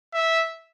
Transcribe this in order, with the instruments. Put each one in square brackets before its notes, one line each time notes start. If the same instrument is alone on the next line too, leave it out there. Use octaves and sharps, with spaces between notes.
[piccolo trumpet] E5